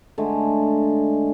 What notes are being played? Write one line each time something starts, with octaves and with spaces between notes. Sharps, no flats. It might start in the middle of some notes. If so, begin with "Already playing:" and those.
D3 G#3 A3